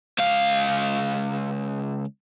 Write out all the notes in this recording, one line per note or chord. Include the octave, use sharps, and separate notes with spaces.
C#2 F5